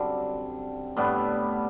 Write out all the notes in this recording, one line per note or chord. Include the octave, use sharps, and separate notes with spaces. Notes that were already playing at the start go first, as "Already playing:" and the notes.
Already playing: F#2 D3 G3 C4
A2 G3 B3 D4